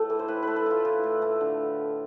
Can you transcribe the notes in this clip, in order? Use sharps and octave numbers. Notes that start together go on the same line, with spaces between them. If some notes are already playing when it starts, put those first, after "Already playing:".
Already playing: A2 A3 A4
E3
C5
A2 B4
A3 B4
A4
A2 F4
E3
A2
A3
D3